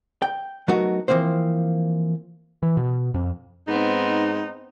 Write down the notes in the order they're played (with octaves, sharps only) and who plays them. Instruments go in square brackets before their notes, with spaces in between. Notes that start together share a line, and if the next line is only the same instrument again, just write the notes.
[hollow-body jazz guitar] G5
F#3 A3 B3 D#4 F#4 A#4
E3 F3 A#3 C4 C5
[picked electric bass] E3
B2
F2
[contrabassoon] G#2 [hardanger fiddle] B3 C4 [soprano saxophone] D#4